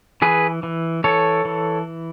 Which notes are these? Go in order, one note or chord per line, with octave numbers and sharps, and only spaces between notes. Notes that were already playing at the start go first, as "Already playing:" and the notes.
E3 G#4 B4
E3
E3 A4 C#5
E3